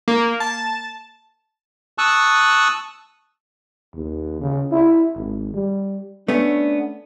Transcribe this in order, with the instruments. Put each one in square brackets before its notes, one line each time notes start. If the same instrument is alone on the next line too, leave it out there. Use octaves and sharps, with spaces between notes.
[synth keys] A#3
A5
[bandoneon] A5 C#6 D#6 E6 F#6
[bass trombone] D#2
C#3
E4
G#1
G3
[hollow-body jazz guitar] A3 B3 C#4 [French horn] D4